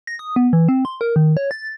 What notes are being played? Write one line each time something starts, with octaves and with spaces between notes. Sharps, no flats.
A#6
D#6
B3
E3
C4
C6
A#4
D#3
C#5
A6